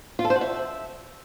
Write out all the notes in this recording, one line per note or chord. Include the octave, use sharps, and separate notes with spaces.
F4
A4
C5
F#4
E5